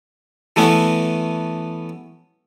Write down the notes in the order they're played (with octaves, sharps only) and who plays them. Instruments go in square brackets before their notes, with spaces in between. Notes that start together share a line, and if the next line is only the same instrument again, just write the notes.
[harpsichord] E3 A3 B3 C#4